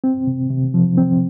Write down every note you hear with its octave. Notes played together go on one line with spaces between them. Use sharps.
C4
C3
C3
F3
C4